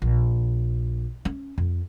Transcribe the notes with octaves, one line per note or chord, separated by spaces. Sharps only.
A#1
C#4
F2